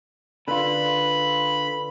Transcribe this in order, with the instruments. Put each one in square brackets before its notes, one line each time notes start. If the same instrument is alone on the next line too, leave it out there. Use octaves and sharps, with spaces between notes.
[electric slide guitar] D3 [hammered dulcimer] F4 B4 [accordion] B5